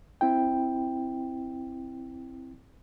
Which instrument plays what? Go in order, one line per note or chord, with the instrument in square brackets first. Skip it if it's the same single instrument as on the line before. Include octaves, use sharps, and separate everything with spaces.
[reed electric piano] C4 E4 G5